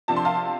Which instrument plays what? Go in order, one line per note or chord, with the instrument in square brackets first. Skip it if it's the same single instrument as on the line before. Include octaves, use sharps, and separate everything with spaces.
[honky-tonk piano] C3 F3 D4 A5
C6
F5 A5